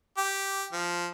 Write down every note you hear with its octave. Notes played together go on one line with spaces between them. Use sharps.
G4
F3